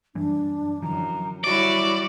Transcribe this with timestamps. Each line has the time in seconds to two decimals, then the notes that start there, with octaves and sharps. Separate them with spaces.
0.15 F#2 E3 G3 D4
0.82 F#2 D3 E3 F3 A#5
1.44 G3 E4 F#4 C#5 D5